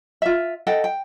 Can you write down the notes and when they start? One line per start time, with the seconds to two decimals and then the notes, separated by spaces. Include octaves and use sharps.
0.22 F4 E5
0.67 A4 D#5 F#5 G5
0.84 G5